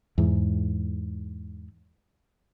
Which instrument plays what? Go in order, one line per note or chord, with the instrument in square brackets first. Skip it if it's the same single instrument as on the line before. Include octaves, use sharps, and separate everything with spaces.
[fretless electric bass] E2 G#2